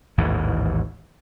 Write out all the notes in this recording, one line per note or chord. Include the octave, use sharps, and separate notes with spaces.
A1 D#2 G#2 E3